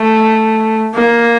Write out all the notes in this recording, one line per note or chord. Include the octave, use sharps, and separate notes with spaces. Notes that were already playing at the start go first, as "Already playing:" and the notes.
Already playing: A3
A#3